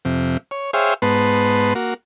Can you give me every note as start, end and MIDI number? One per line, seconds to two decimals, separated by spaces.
0.05 0.37 41
0.05 0.37 48
0.51 0.71 73
0.73 0.94 68
0.73 0.94 72
0.73 0.94 73
0.73 0.94 76
0.73 0.94 77
0.73 0.94 79
1.02 1.74 44
1.02 1.74 59
1.02 1.74 71
1.02 1.74 81
1.02 1.74 84
1.75 1.94 58
1.75 1.94 66